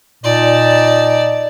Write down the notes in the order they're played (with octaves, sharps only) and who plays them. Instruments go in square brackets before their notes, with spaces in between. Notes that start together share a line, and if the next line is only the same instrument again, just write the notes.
[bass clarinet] A#2 [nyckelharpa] D#4 A5 [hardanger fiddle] D5